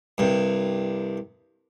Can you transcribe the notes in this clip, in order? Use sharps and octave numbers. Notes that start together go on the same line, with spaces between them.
C2 G2